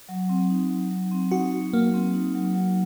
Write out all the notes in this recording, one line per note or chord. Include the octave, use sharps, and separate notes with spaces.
F#3
C4
D#4
F#3
F#3
C4
D#4 F#4
F#3
F#3 A#3
C4
D#4
F#3
F#3